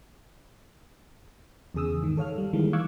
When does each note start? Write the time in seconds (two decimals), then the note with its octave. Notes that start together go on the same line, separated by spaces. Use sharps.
1.74 E2 C#3 G#4 D#6 E6
2.02 G#2 D#3
2.17 A4 C#5 F5 F6
2.38 G3
2.53 D#3 E3 G#3 A#3
2.73 F5 C#6 D6 E6 F#6 G#6